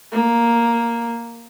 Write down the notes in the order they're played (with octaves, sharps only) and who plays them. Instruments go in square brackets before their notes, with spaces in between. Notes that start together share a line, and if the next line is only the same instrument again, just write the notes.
[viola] A#3